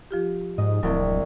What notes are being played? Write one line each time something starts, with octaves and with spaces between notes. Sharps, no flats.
F3 F4 G4
G#2 D#5
D1 C2 F2 F3 F#3 C4